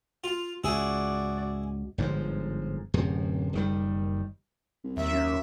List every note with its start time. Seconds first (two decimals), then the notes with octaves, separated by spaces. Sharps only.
0.24 F4
0.64 C#2 G#2 E4 F#4 G#4 D5
1.98 G1 G#2 E3 F3
2.94 D1 F#2 C3
3.53 F#1 D#3 G3
4.84 C2
4.97 D#2 E5
5.11 F#2